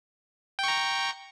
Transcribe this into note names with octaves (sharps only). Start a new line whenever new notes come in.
G5 A#5 C#6